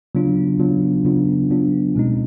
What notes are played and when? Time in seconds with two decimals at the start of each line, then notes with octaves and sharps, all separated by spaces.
0.15 C#3 F#3 B3 D4 F4
0.59 C#3 F#3 B3 D4 F4
1.05 C#3 F#3 B3 D4 F4
1.50 C#3 F#3 B3 D4 F4
1.95 B2 G#3 C4 D#4